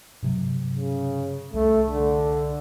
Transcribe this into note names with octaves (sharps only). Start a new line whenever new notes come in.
G2 C3 F#3
C#3
C2 A3
D3